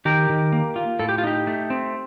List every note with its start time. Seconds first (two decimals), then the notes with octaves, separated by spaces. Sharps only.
0.05 D#3 G4 A#4
0.30 D#3
0.52 A#3
0.76 F4
0.99 A2 A4
1.09 G4
1.18 F4
1.24 D#4 G4
1.47 A3
1.70 C4